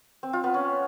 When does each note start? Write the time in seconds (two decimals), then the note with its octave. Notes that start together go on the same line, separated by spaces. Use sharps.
0.23 C4
0.33 F4
0.44 B3
0.54 C#4